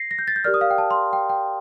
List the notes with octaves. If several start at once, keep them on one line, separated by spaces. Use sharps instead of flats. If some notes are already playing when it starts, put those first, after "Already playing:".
Already playing: A#6 C7
A#6
G6
A6
G6
G4 A#4 D5 F6
D#6
F5
G5
A5
C6
G5
G5